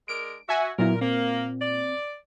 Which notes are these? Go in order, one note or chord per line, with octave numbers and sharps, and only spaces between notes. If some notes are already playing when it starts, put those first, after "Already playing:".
G#3 D4 A#4 D7
F#4 E5 G#5
A#2 F#3 B3 E4 A#4
A#3 C4
D5